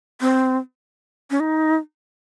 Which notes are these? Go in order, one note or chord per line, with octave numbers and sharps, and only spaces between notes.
C4
C#4
D#4